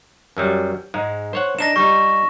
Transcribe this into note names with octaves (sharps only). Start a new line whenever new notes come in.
F#2 F#3 G3
G#2 G#3
C5 C#5 F#5
D4 D#4 A#6 E7
G3 D#4 C#6